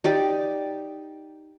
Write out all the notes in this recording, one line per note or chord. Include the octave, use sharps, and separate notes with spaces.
D#4 G4 D5